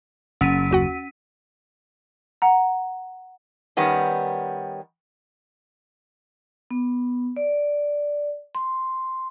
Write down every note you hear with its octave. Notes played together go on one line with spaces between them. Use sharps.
F#1 C#4 B6 D#7
D#2 F#4 F#5
F#5 A#5
D#3 G3 B3 C#4
B3
D5
C6